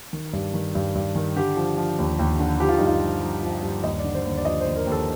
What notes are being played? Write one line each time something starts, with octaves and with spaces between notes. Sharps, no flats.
D#3
G2
D#3
G2
G2
D#3
D3 G4
F3
F3
D#2
D#2
D3
F3 G4
F4
G2 D#4
F4
F3
F3
F3
G2
D#2 D#5
D5
D3
C5
D#2 D5
D5
F3 D#5
C5
D#2
A#4
D#2
A4